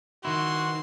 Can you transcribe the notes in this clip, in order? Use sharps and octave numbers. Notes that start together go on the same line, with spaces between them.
D#3 E4 F#4 C6